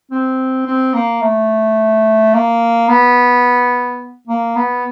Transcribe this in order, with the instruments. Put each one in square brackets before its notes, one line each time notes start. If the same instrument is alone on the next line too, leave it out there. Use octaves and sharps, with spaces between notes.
[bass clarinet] C4
C4
A#3
A3
A#3
B3
A#3
B3